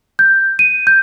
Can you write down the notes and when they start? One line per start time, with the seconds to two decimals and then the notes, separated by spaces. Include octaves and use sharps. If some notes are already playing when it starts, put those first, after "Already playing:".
0.19 G6
0.59 D#7
0.87 G6